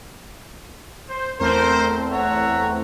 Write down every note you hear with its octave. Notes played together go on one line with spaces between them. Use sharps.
C5
E2 A3 C4 A#4 C5
C#5 E5 F#5 A#5